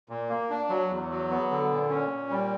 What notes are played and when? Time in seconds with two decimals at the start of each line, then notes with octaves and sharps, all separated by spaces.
0.09 A#2
0.29 A#3
0.50 D4
0.69 F#3
0.89 E2
1.10 F#3
1.30 B3
1.50 D3
1.70 A#2
1.90 C#4
2.10 A#2
2.30 G3